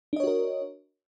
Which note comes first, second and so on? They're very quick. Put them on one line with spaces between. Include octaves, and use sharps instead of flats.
D4 D#5 C#5 F#4 A#4